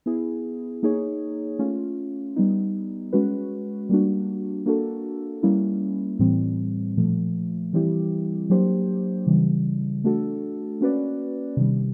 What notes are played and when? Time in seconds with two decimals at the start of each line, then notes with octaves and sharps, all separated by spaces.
0.06 B3 E4 G#4
0.83 A#3 D#4 G#4 C#5
1.59 A3 C#4 F4
2.36 G3 B3 D#4
3.13 G#3 C#4 F#4 B4
3.89 G3 A#3 D4 F#4
4.66 A#3 D4 F#4 A4
5.43 G3 A#3 C#4 E4
6.19 A2 E3 G3 C4
6.97 A#2 F3 A3
7.73 E3 G3 C4 E4 G4
8.50 F#3 A#3 D4 G4 C5
9.27 C#3 E3 G3
10.04 A3 D4 F#4 A4
10.81 A#3 C#4 F#4 B4 D5
11.57 C3 D#3 G3